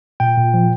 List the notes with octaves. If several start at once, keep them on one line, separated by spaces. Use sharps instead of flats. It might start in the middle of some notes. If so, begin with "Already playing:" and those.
A#2 G5
A#2
F3